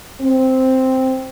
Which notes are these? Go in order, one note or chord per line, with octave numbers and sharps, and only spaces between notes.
C4